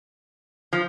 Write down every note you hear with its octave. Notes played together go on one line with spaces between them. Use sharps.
F3